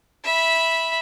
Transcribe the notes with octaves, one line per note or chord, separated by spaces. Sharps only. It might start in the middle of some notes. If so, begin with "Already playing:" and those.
E5 B5